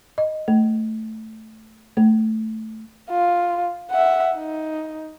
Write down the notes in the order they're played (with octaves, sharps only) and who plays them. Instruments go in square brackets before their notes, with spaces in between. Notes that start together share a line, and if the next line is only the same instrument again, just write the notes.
[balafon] D#5
A3
A3
[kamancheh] F4
E5 F#5
D#4